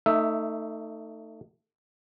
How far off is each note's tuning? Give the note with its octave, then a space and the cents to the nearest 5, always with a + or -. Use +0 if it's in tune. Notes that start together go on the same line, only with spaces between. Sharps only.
A3 +25 D#4 +0 E5 +0